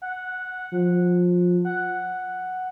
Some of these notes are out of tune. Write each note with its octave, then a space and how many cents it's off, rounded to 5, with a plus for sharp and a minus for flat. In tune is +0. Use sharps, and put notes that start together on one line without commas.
F#5 -5
F3 +25
F#5 +0